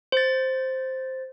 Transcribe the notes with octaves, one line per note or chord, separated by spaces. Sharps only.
C5 A6